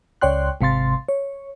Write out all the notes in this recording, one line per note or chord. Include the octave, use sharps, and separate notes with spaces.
C#2 C#5 D5 G5 C6 F#6
G#1 C3 F5 C6 A6
C#5